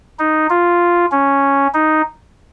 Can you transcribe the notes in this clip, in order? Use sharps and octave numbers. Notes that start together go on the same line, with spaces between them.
D#4
F4
C#4
D#4